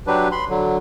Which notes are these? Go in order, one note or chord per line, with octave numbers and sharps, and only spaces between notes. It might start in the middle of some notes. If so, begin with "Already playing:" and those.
F#3 D4 G4 B4
B5 C6
D3 F#3